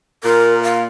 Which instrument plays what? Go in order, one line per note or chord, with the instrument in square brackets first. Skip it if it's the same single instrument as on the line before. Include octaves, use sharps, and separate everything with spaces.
[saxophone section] A#2 [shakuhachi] A#4
[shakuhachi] F5